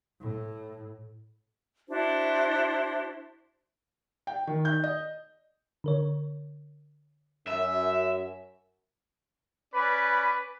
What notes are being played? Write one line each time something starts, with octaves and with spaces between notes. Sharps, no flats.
A2
D4 E4 F#4 C5
G5
D#3
G6
D#5
D3 A#4 C#5
F#2 E5
C#4 B4 D5 B5